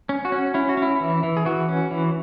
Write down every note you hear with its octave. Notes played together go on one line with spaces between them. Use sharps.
C#4
F#4
C#4
C#4 E4
F#4
C#4 E4
E3
E3
G#4
E3 F#4
C#4
E3